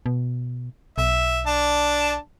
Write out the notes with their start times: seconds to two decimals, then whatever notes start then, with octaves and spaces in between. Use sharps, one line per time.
0.06 B2
0.98 B1 E5
1.47 D4 A5